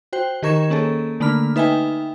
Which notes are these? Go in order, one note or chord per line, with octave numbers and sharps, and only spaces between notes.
F#4 C5 G5
D#3 G4 A#4 C#6 G#6 E7
A#3 C#4 G#4 A4
D3 A3 A#3 D4 B5 F6
D#4 B4 E5 G5 G#5